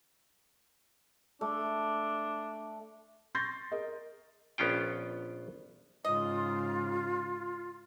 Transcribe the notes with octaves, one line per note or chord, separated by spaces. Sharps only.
A3 D4
C6 C#6 G6 A6 A#6 C7
G#4 A#4 D#5
A#1 B3 C#4 F4 G5
G#2 C#3 F4 D#5